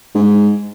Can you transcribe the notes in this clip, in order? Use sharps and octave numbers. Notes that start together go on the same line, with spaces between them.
G#2